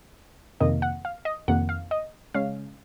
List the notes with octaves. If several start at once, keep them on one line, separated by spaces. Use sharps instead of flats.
F2 C3 D#3 A#3 D#5
F#5
F5
D#5
F2 C3 D#3 A#3 F#5
F5
D#5
C#3 G#3 C#4 F5